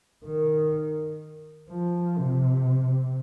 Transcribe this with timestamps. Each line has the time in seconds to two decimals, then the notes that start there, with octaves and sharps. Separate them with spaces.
0.25 D#3
1.69 F3
2.17 C3